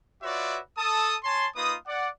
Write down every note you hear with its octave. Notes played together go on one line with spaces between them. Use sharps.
F4 F#4 B4 C#5 D5 E5
A4 A5 D#6
C#5 G#5 A5 C6
A#3 D#4 F4 B4 D#6
D5 F#5